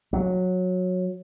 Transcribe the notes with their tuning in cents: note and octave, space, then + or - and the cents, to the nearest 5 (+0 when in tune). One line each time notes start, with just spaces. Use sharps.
F#3 -15